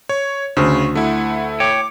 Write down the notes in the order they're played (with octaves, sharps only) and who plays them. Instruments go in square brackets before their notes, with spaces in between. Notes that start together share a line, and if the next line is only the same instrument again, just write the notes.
[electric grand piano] C#5
[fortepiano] D2 [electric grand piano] C#3 [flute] C#6
[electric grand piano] A3 E4 [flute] F#5
[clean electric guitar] C#5 G5 [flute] D6